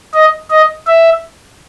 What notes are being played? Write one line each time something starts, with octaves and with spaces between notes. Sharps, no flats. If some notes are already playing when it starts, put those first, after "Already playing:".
D#5
D#5
E5